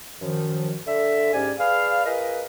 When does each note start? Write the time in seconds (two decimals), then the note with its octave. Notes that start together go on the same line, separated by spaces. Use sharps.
0.20 F#2 D#3 F3
0.86 D3 A4 E5
1.33 G#2 G3 C#4 G4 D5 G#5
1.59 G#4 B4 D5 F5
2.05 F4 G#4 A#4 B4 D#5